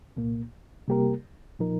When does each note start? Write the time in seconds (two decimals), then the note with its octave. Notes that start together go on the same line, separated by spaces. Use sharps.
0.17 C2 A#2 A#3
0.88 C3 G3 A#3 G4 A#4
1.59 A#2 F3 D#4 A#4